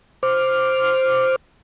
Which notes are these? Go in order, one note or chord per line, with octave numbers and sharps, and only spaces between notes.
C5 D6 F6